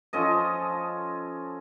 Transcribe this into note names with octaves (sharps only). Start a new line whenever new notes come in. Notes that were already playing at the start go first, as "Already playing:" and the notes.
F3 C#4 A4 D#5